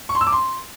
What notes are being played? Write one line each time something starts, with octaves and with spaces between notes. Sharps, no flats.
C#6
C6
E6
D6
C6